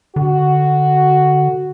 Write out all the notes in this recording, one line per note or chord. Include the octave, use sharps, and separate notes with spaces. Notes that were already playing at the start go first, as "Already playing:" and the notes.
D3 F#4